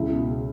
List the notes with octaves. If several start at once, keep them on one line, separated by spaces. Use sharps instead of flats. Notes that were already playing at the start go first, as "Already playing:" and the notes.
Already playing: C#2 E4
B2